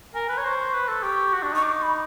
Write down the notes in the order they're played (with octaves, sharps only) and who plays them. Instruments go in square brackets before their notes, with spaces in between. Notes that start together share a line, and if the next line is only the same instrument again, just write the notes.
[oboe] A#4 [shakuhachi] G#5
[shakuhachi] G#5
[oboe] B4
[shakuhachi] A#5
[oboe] C#5
[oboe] C5 [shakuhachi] C#6
[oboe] B4
A4
[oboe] G4 [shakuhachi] C#6
[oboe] F#4
D4
[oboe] D#4 [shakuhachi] C#6
[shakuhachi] D6
C#6
B5